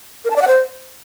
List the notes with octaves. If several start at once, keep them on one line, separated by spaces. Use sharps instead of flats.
A#4
A5
D5
F#5
C5